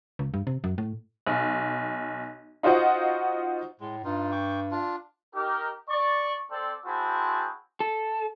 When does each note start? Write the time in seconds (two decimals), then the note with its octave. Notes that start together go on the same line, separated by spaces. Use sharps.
0.19 C#2
0.34 G2
0.47 C3
0.64 F#2
0.78 A2
1.27 B1
2.63 D#4 F4 F#4 C5 D#5 F#5
3.80 A2 G#3
4.04 G2 D#4 F4
4.32 G5 C#6 D6
4.71 D4 F4
5.35 D#4 G4 A#4
5.89 D5 C#6
6.51 C4 A4 D5
6.85 C4 E4 F#4 G#4 C5 A5
7.80 A4